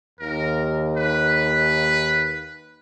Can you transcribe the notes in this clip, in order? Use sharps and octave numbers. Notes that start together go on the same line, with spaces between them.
D#2 A#4
B4